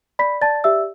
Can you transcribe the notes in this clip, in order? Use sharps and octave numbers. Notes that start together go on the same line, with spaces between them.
D5 B5 B6
D5 A5 A6
G4 E5 E6